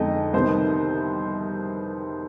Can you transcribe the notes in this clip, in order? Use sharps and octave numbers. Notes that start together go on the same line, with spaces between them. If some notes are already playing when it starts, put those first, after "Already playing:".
Already playing: F2 D3 G#3 B3 D#4 D#5
C2 C3 D#3 B3 D#4 C5